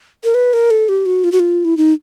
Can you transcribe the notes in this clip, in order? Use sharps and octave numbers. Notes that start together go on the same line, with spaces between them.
A#4
B4
A#4
A4
G4
F#4
F4
F#4
F4
E4
D#4